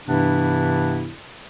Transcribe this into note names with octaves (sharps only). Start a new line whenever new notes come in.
G2 C3 E3 B3 D4 E4